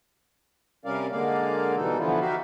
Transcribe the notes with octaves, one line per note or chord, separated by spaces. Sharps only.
C3 G3 C#4 A#4 D5 F5
D3 G#3 A#3 D5 F5
B2 E3 G3 D#4 A4
D3 E3 F3 B3 E4 F4
D#4 F#4 G4 E5 F5